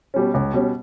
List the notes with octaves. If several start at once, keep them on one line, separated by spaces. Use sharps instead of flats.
B2 G3 C#4
C#2
B2 G3 C#4